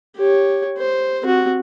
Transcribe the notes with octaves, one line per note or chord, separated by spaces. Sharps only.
G4 C#5
C5
C4 F#4